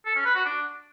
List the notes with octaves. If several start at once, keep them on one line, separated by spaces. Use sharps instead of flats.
A4
C#4
B4
F#4
D4